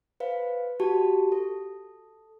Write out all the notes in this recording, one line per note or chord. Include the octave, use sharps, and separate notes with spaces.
B4 C5 F5
F#4 G4 A5
A4